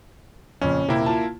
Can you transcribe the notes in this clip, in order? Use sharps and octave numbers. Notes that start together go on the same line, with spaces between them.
F2 A#2 C#3 C#4
D#1 C3 A#3 E4 G5
F4 A5